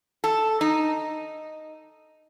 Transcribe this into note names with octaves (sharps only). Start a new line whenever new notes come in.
A4
D#4